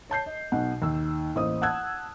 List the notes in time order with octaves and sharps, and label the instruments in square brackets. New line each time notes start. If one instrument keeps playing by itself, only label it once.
[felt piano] C#5 A5 G6 C7
D#5
B1 B2 F#5
D#2 E6
A1 A#3 C5 D#5 D#6
F#5 A5 E6 F#6 G#6